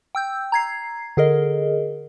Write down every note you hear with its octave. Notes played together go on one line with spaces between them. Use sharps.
G5 E6 G6
A#5 G#6 C7
D3 G#4 A#4 D#5